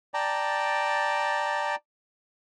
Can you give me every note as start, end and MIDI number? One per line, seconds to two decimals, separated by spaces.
0.14 1.75 74
0.14 1.75 79
0.14 1.75 81
0.14 1.75 82